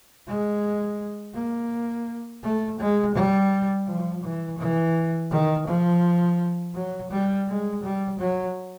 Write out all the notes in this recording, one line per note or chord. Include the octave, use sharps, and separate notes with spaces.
G#3
A#3
A3
G#3
G3
F3
E3
E3
D#3
F3
F#3
G3
G#3
G3
F#3